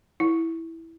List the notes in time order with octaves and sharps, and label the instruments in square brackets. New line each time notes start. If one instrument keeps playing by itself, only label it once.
[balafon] E4